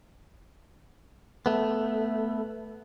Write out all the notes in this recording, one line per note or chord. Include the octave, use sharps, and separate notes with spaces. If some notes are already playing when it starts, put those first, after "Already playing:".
A3 B3